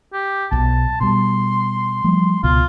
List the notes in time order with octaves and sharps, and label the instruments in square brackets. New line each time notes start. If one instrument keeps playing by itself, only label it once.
[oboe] G4
[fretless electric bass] B1 B2 [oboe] A5
[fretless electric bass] B2 G3 [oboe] C6
[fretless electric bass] F3 G3 A3
[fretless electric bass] C#2 B2 [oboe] F4